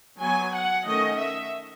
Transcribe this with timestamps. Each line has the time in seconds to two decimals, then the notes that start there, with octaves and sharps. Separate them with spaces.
0.21 F#3 B3 G#5
0.54 F#5
0.86 D#3 A3 C#4 D#5
1.19 E5